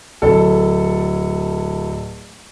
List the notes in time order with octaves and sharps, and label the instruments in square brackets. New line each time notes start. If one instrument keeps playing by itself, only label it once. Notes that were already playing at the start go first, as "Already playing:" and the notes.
[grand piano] D1 A4